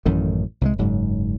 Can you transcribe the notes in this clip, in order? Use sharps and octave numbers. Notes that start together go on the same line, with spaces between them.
A1 F#2 A2 D#3
C2 E3 G#3
F#1 G#2 F#3